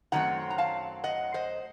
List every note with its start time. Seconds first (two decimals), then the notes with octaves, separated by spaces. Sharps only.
0.12 F#2 D#3 F#3 A3 C4 F#5 A#5
0.50 A#5
0.58 F5 A5
1.04 D#5 F#5
1.34 C5 D#5